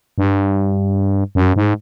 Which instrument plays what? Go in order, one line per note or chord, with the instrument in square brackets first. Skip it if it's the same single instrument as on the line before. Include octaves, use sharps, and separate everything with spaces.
[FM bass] G2
F#2
G#2